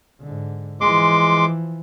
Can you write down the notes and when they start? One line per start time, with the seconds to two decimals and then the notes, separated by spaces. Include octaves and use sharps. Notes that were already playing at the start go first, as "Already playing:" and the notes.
0.21 G#2 D3
0.81 E3 F3 G#3 C6 D6